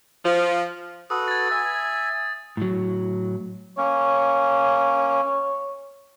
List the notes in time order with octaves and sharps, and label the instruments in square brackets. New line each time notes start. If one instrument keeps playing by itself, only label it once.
[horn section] F3
[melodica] F#4 A4 B4 [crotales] D#6
[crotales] G#6 A6
[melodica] E5 G#5
[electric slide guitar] A2 F#3
[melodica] A#3 C#4 [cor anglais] C#5